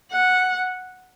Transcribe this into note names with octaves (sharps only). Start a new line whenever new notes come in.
F#5